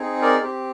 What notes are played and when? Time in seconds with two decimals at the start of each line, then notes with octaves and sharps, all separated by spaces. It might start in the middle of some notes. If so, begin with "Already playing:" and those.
Already playing: C4 D#4 G#4
0.22 A#4 D5
0.40 C4 G4